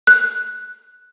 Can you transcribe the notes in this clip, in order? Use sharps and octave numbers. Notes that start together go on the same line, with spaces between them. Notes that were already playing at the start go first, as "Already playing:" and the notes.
F#6